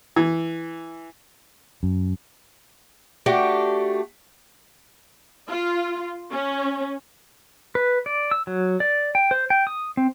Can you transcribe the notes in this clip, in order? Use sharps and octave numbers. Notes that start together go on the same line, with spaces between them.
E3
F#2
A3 D4 F#4 G4
F4
C#4
B4
D5
E6
F#3
D5
G5
C5
G5
D#6
C4